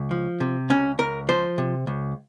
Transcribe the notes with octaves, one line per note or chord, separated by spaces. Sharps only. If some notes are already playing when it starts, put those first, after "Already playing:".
Already playing: C#2
F3
C3
C#2 C#4
C#2 A#4
F3 C5
C3
C#2